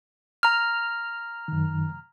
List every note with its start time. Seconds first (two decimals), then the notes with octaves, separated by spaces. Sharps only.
0.43 A#5 F6
1.48 F#2 D#3